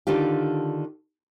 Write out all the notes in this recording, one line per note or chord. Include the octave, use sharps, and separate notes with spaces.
D3 D#3 D4 F4 G4